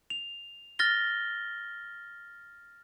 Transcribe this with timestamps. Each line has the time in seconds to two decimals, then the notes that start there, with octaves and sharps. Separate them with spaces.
0.10 F7
0.79 F6 A6 A#6 G7